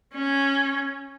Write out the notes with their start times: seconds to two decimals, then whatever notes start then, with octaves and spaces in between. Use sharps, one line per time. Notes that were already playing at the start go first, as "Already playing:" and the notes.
0.13 C#4